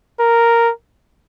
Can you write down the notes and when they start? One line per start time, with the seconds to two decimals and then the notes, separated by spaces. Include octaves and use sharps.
0.20 A#4